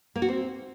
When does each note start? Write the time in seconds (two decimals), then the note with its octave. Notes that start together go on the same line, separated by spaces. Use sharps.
0.16 A#3
0.22 F#4
0.28 C4